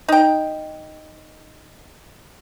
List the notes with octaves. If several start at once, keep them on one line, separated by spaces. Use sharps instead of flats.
D#4 G5